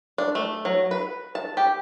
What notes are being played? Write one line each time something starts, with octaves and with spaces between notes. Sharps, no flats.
D4
A3
F#3
B4
A5
G4